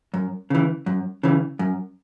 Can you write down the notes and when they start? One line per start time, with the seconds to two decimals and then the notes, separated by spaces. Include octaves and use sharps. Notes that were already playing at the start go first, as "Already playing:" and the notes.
0.14 F#2
0.50 C#3 E3
0.86 F#2
1.23 C#3 E3
1.59 F#2